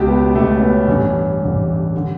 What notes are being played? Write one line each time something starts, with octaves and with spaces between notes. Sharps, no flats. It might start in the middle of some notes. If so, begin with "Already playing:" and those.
Already playing: C#2 B2 G4
B3
B2 A3
C#2
C#4
B3
A1 G2 E3 C#4
A1 G2 E3
D3